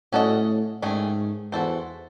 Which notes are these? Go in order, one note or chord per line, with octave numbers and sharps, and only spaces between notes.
A2 C#4 F#4 A4 D#5
G#2 D#3 A3 C#4 G#4
E2 E3 C4 F#4 A4 C5